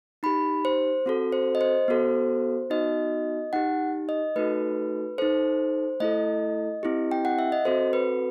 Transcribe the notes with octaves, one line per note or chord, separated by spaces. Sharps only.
D#4 G4 B5
C5
C4 F#4 A4
C5
D#5
C5
B3 F#4 A4
B3 D#4 F#4 D#5
D#4 G4 F#5
D#5
A3 D#4 F#4 A4 B4
D#4 A4 C5
A3 E4 A4 D#5
C4 E4 G4
G5
F#5
E5
D#5
C4 F#4 A4 C5
B4